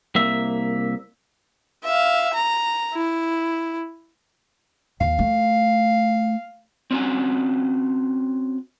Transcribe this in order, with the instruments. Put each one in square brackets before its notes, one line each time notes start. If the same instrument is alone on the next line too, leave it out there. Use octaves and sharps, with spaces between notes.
[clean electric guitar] C2 A#3 E5
[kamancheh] E5 F5
A#5
E4
[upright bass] D#2 [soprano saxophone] F5
[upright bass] A3
[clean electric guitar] C4 C#4 F#4 G#5